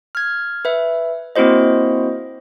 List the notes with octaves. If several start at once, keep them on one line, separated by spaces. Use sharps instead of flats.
F6 G#6
B4 E5
A#3 C4 E4 F#4 C5 D#5